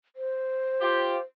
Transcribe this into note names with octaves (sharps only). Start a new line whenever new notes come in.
C5
F4 G4